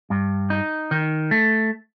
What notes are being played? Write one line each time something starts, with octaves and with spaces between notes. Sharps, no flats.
G2
D#4
D#3
A3